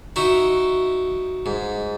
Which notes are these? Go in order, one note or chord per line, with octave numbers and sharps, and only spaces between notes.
D#4 E4 F#4
G#2